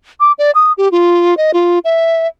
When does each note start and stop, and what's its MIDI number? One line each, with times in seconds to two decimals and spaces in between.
0.20 0.32 86
0.38 0.51 74
0.55 0.72 87
0.78 0.91 67
0.92 1.37 65
1.37 1.51 75
1.54 1.79 65
1.85 2.27 76